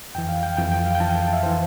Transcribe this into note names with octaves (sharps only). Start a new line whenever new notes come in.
F2 E3 G5
F5
G5
F2 E3 G5
G5
F5
G5
F2 E3 A5
G5
F5
E5
E3 C5